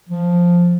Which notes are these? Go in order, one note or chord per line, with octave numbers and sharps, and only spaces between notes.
F3